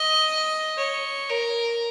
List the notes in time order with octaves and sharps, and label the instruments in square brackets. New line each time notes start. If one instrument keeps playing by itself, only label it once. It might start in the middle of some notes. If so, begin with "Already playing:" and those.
Already playing: [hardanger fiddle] D#5
C#5
A#4